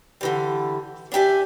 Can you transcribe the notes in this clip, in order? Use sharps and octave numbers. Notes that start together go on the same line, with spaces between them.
D3 E3 G3
D4 E4 G4 E5 G#5